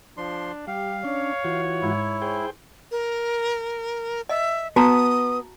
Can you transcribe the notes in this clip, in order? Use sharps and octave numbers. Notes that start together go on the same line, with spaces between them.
F3 D4 C6
G3 G4 F5
C#4 D4 C#5
E3 F4 F#4
G#2 E4
G#4 C5 G5
A#4
D#5 E5
B3 F#4 A5 A#5 D#6